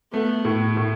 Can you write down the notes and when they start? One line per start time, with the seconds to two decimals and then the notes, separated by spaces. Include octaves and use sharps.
0.13 A3 B3
0.45 A2
0.77 A2